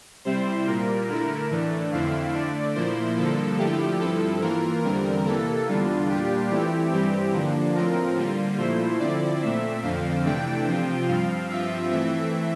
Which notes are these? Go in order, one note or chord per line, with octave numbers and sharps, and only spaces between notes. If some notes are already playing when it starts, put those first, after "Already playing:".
C3 G3 C4 E4 C5
A#2 G3 A#3 A#4
D3 A3 E4 A#4
A2 E3 A3 D4
F2 D3 A3 C4 E4 F5
D3 A3 D4 D5
A#2 F3 A#3 E4 C5
G2 D3 F3 A#3 A4
D3 F3 A3 E4 G4
G2 F3 C4 E4 A4
E3 A#3 F4 A#4
E2 D3 G3 C4 A#4
C3 E3 A#3 A4
E2 D3 G3 D4 F4
A#2 G3 D4 F4 G4
E3 A3 C4 E4 G4
G2 E3 G3 C4 G4
D3 F3 A#3 D4
A2 F3 C4 F4 A#4
D3 G3 A#3 F4
A#2 F3 A3 E4 C5
D3 F3 C4 E4 D5
A#2 A3 C4 E5
F2 D3 F3 C4 F5
C3 E3 A3 D4 G5
C3 F3 C4 F4 G5
G2 F3 C4 F5
G2 F3 C4 F4 E5
E3 A3 C4 E5